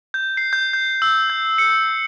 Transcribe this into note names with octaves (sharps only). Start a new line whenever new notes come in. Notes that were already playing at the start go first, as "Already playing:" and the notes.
G6
C7
G6
G6
E6
G6
C#7